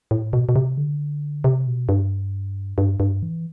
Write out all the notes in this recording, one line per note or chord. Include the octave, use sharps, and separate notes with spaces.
A2
B2
B2
C3
D3
C3
B2
G2
G2
G2
E3